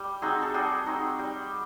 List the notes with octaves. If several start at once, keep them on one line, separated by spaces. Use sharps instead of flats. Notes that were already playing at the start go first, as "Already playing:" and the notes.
Already playing: G3
C4 D#4 F#4 G#4
A4
G3 F#4 G#4
C4 D#4
G3